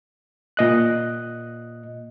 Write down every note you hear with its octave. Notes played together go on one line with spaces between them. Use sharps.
A#2 D#5 F#6